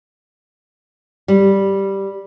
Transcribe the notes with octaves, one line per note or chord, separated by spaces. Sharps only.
G3